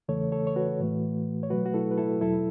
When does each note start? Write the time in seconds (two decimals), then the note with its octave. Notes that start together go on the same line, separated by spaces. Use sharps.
0.08 E2 C#3 E3 A3 A4 C#5
0.32 A4 C#5
0.47 C#5
0.56 F#4 B4
0.80 A2 E3 A3
1.43 C#5
1.50 B2 F#3 A3 F#4 B4
1.66 F#4
1.74 E4 A4
1.91 B4
1.98 E4 A4
2.21 E2 B2 F#3 E4 A4